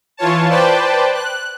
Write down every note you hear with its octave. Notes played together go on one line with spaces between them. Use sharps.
E3 F4 C#5 A5
B4 C5 D5 G5 A5
F#6